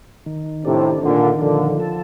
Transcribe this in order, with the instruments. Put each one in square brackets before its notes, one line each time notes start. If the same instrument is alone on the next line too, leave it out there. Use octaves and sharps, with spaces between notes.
[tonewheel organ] D#3
[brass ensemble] A2 C3 [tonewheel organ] D4
[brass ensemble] A#2 D3 [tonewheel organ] D#3
[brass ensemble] A#2 D3 [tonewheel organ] F3
[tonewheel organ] A4